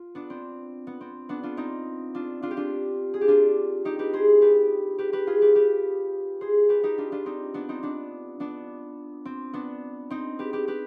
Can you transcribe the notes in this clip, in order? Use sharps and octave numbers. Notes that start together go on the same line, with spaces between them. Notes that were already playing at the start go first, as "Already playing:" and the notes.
Already playing: F4
B3 D4
C4
B3
C4
B3 D4
D4 F4
C4 D#4
D4 F4
D4 F4
G4
D4 F4
G#4
G4
D4 F4
D#4 G4
G4 B4
G#4 C5
G4 B4
G4 B4
G4 B4
F4 G#4
G4 B4
G4 B4
G#4 C5
G4 B4
D#4 G4
D4 F4
D4 F4
C4 D#4
B3 D4
C4 D#4
B3 D4
B3 D4
C4
B3 D4
C4 D#4
G4 B4
G4 B4
G4 B4